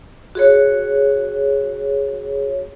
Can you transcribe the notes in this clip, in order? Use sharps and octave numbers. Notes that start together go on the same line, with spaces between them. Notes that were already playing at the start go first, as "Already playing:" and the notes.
F#4 G#4 C#5